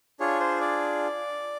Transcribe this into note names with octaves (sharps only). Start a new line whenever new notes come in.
D4 F4 G#4 C#5
C5
D5